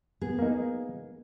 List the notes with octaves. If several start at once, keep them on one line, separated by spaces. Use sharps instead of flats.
B3 G#4
A#3 D#4